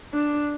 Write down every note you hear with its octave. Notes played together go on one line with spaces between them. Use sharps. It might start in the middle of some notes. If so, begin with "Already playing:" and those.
D4